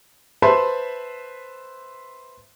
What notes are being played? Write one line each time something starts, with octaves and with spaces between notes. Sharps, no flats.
B4 C5 E5 A5 B5 C6